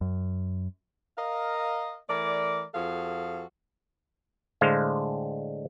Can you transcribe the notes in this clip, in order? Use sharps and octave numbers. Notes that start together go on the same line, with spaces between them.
F#2
A#4 D#5 F5
E3 A3 A#4 D5
F2 F3 F#4 G#4 A4 F5
A2 D3 G#3 C5 F5